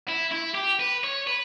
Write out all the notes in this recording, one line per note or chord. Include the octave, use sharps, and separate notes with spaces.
E4
E4
G4
B4
C#5
B4